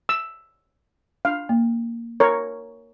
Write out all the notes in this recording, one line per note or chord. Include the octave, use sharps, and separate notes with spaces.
E6
D4 F5
A#3
A#4 C#5